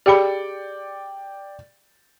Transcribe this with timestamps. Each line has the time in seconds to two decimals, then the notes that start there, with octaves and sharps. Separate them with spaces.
0.06 G4 G#4 D5 G5 B5 C#7